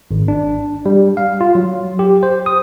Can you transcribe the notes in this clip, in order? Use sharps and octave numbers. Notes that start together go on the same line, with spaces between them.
G#1
D4
G3
F5
F4
F#3
G4
C5
D#6